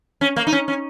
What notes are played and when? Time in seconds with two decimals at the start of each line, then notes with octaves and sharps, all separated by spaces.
0.21 C#4
0.36 A#3
0.47 D#4
0.53 C#4
0.68 C#4